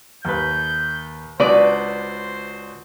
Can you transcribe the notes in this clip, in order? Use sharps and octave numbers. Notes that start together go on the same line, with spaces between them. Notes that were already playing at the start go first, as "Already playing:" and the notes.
D#2 B4 G6
C#2 D4 F#4 B4 C5 D5